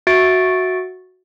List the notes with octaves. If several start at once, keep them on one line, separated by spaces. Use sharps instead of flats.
F#4 E5 C#6 A6 D7